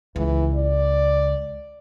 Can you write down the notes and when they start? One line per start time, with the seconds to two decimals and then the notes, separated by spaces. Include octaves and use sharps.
0.16 C#2 E3
0.55 D5